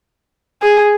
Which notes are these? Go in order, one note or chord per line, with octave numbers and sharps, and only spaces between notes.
G#4